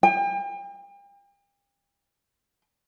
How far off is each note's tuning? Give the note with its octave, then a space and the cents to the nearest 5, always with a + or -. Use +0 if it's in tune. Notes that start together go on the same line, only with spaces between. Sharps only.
G5 +40